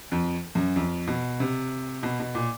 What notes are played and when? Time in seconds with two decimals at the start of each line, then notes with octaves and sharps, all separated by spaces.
0.12 F2
0.55 F#2
0.76 F2
1.07 B2
1.40 C3
2.03 B2
2.20 B2
2.35 A#2